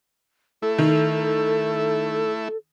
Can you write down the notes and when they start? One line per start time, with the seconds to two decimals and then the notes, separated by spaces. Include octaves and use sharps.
0.62 A3 E4 A4
0.78 D#3